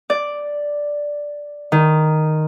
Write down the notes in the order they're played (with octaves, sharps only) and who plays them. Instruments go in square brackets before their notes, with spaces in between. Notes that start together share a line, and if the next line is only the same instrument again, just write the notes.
[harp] D5
D#3